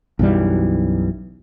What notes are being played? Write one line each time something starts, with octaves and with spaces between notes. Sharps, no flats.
B1 F#2 E3 G3